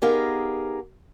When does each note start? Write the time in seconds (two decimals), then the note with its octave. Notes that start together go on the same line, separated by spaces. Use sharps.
0.02 B3 D#4 G4 G#4 A#4 F5